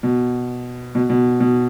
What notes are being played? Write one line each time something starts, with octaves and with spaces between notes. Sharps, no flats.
B2
B2
B2
B2